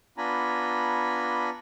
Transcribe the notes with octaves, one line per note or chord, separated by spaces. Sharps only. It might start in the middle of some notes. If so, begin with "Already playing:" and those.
B3 D4 F4 G#5 A#5 B5